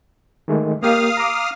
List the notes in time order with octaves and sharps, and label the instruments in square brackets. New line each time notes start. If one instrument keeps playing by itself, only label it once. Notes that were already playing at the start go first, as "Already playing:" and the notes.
[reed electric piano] D#3 G#3 A3
[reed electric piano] A#3 G4 [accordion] F5 D#6 F6
[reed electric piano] A#5 D6